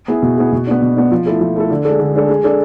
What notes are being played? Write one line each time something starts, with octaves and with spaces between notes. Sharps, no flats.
B3 E4 G#4
B2
B3 E4 G#4
B2
B3 D4
B2
B3 D4
F3
A3 E4 A4
F3
A3 E4 A4
D3
G#3 D4 A4
D3
G#3 D4 A4
G#3
D4 A4